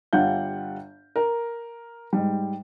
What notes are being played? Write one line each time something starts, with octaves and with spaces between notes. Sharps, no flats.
G1 G3 F4 F5 F#5 G6
A#4
G#2 G3